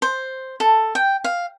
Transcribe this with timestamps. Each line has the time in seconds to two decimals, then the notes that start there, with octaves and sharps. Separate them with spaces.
0.02 C5
0.60 A4
0.95 G5
1.24 F5